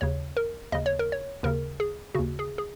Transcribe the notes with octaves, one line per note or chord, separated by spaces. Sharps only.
D#2 C#3 C#5
A#4
D#2 C#3 D#5
C#5
A#4
C#5
D#2 C#3 A#4
G#4
D#2 C#3 F#4
G#4
G#4